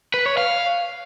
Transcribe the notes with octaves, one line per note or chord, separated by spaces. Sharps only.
B4
C#5
F5